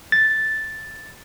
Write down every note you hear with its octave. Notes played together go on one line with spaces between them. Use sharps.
A6